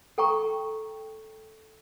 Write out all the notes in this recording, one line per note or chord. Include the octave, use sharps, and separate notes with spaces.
A4 G5 A#5 C#6